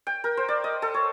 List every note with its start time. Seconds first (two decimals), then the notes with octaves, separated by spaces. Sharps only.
0.07 G5
0.24 A#4
0.37 C5
0.48 D5
0.64 D#5
0.82 A4
0.94 C#5